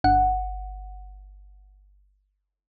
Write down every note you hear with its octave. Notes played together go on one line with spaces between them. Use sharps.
G1 F#5